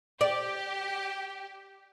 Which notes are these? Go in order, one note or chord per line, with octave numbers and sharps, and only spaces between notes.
G4 D5